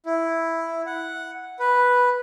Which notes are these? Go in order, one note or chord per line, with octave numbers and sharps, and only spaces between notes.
E4
F#5
B4